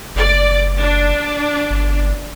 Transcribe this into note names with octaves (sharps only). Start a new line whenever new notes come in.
F#1 D5
D4
G1